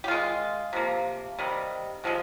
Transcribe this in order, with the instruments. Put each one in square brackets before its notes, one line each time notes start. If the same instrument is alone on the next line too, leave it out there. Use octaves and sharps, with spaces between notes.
[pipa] G4
D#3 G#3 F4
C3 F3 A#3
C3 D#3 G3
C3 F3 G#3